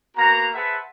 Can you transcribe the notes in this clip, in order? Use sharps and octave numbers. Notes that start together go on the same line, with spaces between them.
A#3 B3 F#4 A#5
G#4 B4 C5 E5 F#5 A5